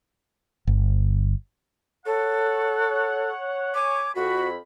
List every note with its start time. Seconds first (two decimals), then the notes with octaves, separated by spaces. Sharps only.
0.67 G1
2.06 A4 C#5 F#5
3.74 C#5 G#5 D6
4.15 F2 F#4 B5